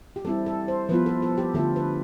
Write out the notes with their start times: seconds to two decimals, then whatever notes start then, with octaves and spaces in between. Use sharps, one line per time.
0.16 G4
0.25 G3 C4 E4 A4
0.46 A4
0.68 C5
0.89 F3 B3 F4 B4
1.06 A4
1.22 A4
1.37 G4
1.54 D3 A3 D4 F4 A4
1.76 B4